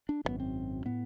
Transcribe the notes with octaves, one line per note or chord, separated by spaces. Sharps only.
D4
G#1 F#2 C#3 B3
C4
A2 B3